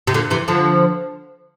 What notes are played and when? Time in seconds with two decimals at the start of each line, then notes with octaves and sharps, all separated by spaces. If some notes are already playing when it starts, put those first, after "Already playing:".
0.07 C3
0.14 A#2 D3
0.30 C3 E3
0.48 D3 F3